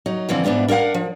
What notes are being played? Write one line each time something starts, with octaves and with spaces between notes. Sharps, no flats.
F#3 D#4
G2 D3 E3 F3 C4
G#2 B3 D4 E4 F4
D4 A#4 C#5 F5 F#5
F3